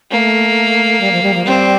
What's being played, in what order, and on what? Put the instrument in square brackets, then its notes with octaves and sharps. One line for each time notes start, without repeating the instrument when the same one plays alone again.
[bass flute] A3 [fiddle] A#3
[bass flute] G3
F3
G3
F3
[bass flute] G3 [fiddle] C4